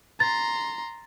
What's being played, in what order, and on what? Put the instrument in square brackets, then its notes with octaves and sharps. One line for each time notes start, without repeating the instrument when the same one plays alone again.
[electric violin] A#5 C6 [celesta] A6